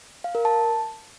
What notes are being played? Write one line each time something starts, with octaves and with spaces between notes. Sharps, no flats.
F5
A#4
A5